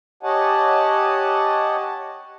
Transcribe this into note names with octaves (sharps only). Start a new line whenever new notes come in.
G4 C#5 D#5 F#5 G#5 A5